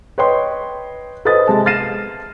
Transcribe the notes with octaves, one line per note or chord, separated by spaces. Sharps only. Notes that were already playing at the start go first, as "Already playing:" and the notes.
B4 C#5 D#5 G5 C6
A4 B4 C5 D#5 D#6 A6
C3 G#3 A5
F6 A6 A#6 C7 D#7 E7